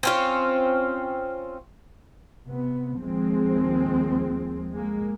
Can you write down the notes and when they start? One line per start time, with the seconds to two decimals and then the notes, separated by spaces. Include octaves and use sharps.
0.03 C4 C#4 F4
2.47 C3 B3
3.02 D#2 F3 G#3 C4
4.74 G#3 A#3